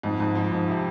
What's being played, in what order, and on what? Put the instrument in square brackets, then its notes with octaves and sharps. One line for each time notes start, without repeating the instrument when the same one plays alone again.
[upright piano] F2 [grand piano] G#2
[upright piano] F2 [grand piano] G#2
[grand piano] G#2 [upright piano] F3
[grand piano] G#2 [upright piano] F3
[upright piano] C3